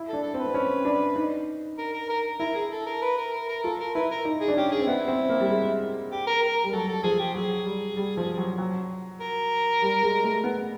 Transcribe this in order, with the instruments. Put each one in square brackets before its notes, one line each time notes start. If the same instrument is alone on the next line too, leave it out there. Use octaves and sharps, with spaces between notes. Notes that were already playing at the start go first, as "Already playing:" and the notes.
Already playing: [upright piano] E4
[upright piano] D4 [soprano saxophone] A4
[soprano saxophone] A4
[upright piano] C4
[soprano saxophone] B4
[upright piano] C4
C#4
D4
D#4
[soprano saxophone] A#4
A#4
A#4
[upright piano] E4 [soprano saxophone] A#4
[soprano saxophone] G#4
A4
A#4
B4
A#4
A#4
A#4
[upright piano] F4 [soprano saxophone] A4
[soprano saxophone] A#4
[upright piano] E4 [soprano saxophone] B4
[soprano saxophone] A#4
[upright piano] D#4
[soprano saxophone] G#4
[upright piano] D4
[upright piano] C#4 [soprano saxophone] G4
[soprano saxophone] G#4
[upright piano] C4
[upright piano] B3 [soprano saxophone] E4
[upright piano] C4
A#3
G3
G#3
[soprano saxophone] G4
A#4
A#4
A#4
[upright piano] G3
[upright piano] F#3 [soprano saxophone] A4
[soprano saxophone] A4
[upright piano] F3 [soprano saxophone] G#4
[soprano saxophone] G4
[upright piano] F#3 [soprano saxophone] G#4
[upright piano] G3
G3
F3
F#3
F#3
[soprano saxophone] A#4
[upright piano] G3
G#3
A3
B3